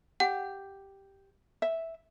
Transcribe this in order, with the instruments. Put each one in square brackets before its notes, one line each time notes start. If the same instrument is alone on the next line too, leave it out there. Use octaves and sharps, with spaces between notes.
[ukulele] G4 [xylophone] F#5
[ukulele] E5